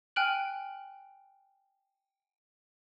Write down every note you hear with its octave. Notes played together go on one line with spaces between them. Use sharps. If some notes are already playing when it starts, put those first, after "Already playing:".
G5 G#5 F6 F#6 D7 F#7